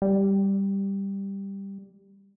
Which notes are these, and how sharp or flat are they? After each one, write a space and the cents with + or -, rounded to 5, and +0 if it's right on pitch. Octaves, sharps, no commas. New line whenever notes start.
G3 +5